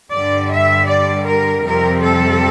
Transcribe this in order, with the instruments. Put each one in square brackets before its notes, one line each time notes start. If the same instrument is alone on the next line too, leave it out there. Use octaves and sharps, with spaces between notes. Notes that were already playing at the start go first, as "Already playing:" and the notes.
[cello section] G2 D3 G3 D5
E5
D5
A#4
F2 C3 G3 C4 A#4
A4